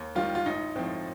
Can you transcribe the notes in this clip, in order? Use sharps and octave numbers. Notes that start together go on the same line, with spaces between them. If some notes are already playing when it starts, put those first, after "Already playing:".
Already playing: D#2
D#3 G3 F4
F4
A1 D#4
A2 F3 C4